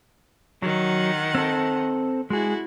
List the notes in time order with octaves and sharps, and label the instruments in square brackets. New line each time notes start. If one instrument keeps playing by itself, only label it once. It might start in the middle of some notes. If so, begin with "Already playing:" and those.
[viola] D#3 F#5 [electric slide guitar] F#3
[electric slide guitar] C4 A4
[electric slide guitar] G#3 G#4 [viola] E4 F#4